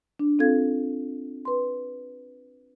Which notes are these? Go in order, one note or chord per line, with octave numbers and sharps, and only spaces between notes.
D4
C4 F4 A4 F5 G#6
B4 C6